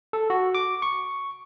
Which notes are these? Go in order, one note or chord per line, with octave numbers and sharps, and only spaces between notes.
A4
F#4
D6
C#6